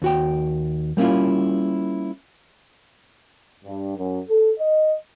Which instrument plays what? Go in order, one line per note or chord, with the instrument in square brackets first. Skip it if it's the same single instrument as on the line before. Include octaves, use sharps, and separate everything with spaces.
[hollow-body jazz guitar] D#2 F#4 G5
G3 A#3 C#4 E4 F4
[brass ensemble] G2
F#2
A4
D#5